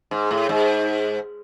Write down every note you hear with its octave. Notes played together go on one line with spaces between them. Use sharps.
G#2
A2
G#2